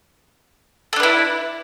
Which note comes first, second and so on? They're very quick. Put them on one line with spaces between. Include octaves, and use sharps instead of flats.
A4 D4 B4 E4